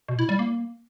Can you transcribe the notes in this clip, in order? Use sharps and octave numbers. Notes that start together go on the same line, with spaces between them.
B2
E4
G3
A#3